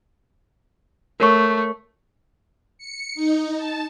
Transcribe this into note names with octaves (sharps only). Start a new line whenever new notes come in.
A3 A#4 C#5 C#6
C#7
D#4
A5